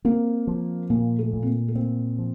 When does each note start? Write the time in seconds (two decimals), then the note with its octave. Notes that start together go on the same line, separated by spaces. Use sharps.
0.04 A#3 C4
0.47 F3
0.90 A#2 A#3
1.19 A3
1.33 A#2
1.42 C4
1.47 A#3
1.68 A3
1.75 A#3 C4
2.18 F3